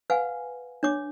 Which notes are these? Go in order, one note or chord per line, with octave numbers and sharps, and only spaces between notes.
B4 F5 F#5 G#5
D4 C#5 D6